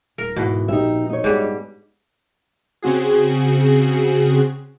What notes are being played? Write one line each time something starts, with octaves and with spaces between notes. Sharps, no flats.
D#1 A#4
E2 G#2 B2 F#5
A#1 D#4 G4 E5
D#4 C#5
G#2 G3 D4
C#3 C4 F#4 G#4